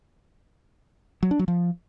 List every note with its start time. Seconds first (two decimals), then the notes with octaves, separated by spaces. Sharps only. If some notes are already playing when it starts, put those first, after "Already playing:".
1.23 F#3
1.31 D4
1.39 F#3
1.48 F3